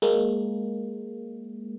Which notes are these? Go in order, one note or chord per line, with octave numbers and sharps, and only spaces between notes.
G#3 A#3